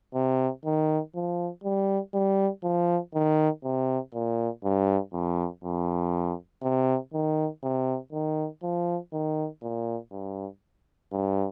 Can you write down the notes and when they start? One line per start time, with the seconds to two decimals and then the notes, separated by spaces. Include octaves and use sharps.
0.14 C3
0.65 D#3
1.15 F3
1.64 G3
2.14 G3
2.64 F3
3.15 D#3
3.64 C3
4.14 A#2
4.64 G2
5.13 F2
5.64 F2
6.62 C3
7.13 D#3
7.63 C3
8.13 D#3
8.63 F3
9.13 D#3
9.62 A#2
10.12 G2
11.12 G2